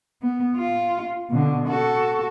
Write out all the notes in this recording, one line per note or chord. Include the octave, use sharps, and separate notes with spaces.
B3
F4
B2 D3
F#4 A4